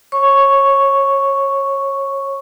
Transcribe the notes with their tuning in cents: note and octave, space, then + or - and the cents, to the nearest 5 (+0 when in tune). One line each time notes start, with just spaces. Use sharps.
C#5 -25 C#6 +0